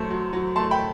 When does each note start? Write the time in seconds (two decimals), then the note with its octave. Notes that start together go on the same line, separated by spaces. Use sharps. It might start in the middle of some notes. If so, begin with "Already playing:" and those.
Already playing: F#2 A3 C5
0.10 F#3
0.33 F#3
0.56 A3 A5 C6
0.71 G5 B5